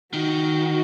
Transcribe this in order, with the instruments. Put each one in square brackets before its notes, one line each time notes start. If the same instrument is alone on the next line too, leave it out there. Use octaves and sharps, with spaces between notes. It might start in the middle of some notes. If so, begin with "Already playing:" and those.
[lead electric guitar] D#3 [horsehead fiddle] F#4